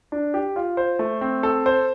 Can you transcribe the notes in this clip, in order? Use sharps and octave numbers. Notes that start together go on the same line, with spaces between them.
D4
G4
F4
C5
A3
C4
A4
C5